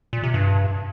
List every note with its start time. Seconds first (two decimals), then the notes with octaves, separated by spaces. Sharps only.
0.13 A#2
0.23 C3
0.34 G2